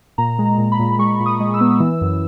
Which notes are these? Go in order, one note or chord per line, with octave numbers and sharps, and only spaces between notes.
A#2 A#5
G#3
A#5
A#2
B5
A#2
G#3 C#6
A#2
D#6
G#3
E6
B3
E3
F#2